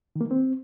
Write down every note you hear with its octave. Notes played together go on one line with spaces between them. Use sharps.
D#3
A#3
D#3
C4